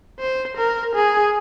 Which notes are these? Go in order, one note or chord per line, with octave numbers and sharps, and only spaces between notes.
C5
A#4
G#4